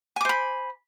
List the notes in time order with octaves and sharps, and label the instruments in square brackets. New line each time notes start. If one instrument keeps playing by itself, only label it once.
[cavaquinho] G#5
D6
C5
B5